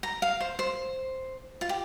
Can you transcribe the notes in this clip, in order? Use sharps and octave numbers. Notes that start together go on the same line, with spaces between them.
A#5
F5
C5
C5
F4
G4